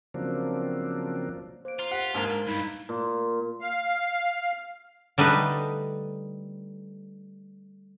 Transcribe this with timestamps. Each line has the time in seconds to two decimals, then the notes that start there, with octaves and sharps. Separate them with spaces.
0.14 C#3 F3 F#3 A#3 C4 D4
1.65 A#3 C5 D7
1.79 F4 A#5
1.91 G4 F#5
2.14 G#2 A#3 D4
2.28 A#5
2.47 G2 D#4 E4 F5
2.89 A#2
3.61 F5
5.18 D3 G3 A3 D#4 B4